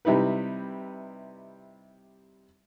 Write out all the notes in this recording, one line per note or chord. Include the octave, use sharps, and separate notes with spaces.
C3 G3 D#4 E4 B4